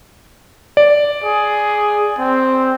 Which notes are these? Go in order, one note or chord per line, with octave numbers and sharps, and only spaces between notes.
D5
G#4
C4